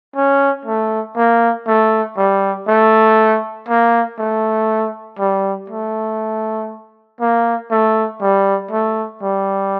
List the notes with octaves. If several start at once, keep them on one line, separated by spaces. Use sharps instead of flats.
C#4
A3
A#3
A3
G3
A3
A#3
A3
G3
A3
A#3
A3
G3
A3
G3